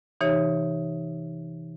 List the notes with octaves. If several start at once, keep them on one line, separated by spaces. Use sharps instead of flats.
C3 E3 D#4 G4 C#5